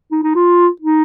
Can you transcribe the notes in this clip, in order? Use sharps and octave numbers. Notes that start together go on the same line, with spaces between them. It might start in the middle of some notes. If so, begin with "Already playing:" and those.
D#4
D#4
F4
D#4